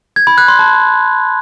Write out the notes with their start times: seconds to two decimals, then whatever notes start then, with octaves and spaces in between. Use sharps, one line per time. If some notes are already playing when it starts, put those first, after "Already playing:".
0.16 G#6
0.27 B5
0.38 F#6
0.48 C6
0.59 A5